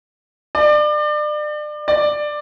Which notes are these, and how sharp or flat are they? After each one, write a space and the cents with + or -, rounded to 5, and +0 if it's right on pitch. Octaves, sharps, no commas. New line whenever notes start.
D5 +35
D5 +15